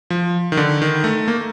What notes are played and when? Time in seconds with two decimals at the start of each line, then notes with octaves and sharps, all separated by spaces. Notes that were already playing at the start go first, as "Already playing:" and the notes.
0.10 F3
0.52 D#3
0.57 D3
0.82 D#3
1.04 A3
1.28 A#3